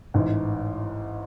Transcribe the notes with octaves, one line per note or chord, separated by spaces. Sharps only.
A1 G#2 E3